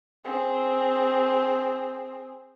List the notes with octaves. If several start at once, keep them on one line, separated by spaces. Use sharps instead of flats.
C4 G#4